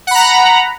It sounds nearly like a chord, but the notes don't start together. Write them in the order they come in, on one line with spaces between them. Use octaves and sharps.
F#5 B5 A#5